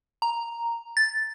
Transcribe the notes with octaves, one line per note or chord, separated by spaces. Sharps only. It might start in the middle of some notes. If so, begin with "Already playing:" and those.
A#5
A6